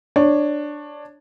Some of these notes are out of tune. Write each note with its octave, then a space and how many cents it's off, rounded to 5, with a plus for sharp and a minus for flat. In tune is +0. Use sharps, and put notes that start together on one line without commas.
D4 +10 C#5 -5